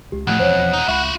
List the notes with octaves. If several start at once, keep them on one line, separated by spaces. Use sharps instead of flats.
C#2 G4
F2 A2 D#3 A3 F#5
E1 C5 C#5
C2 D#4
C#2 F4 F#4 E5 B5